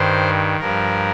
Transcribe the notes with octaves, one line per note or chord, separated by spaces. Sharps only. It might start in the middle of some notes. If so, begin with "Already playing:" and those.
Already playing: G2 D#3 C5
G2 F3 A#4